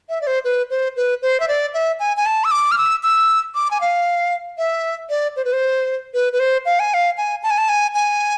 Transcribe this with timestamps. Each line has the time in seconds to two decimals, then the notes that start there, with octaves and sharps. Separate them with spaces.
0.09 E5
0.21 D5
0.27 C5
0.45 B4
0.70 C5
0.97 B4
1.22 C5
1.40 E5
1.48 D5
1.74 E5
2.00 G#5
2.17 G#5
2.26 A5
2.44 E6
2.51 D6
2.71 F6
2.78 E6
3.03 E6
3.55 D6
3.71 G#5
3.81 F5
4.58 E5
5.10 D5
5.36 C5
5.45 B4
5.53 C5
6.14 B4
6.33 B4
6.40 C5
6.66 F5
6.80 G#5
6.94 F5
7.17 G#5
7.43 A5
7.51 G#5
7.58 A5
7.69 G#5
7.95 G#5